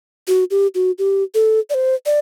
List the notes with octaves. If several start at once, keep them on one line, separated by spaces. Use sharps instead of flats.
F#4
G4
F#4
G4
A4
D5
C5
D5